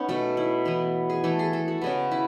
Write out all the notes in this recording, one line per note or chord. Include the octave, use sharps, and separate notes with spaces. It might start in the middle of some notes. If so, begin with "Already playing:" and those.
Already playing: B3 C#4 D#4
B2 A3
E4
E3 B3
G#4
E3 A3 A4
G#4
A4
F#4
C#3 G#3 B3
E4